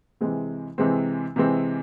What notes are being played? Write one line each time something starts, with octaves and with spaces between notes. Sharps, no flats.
C3 E3 G#3 C4
C3 E3 G#3 C4
C3 E3 G#3 C4